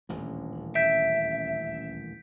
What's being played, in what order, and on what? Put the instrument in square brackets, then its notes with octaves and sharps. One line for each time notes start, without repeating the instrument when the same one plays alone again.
[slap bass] D#1 A1 D2
[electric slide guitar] E5 [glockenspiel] G6 B6 D7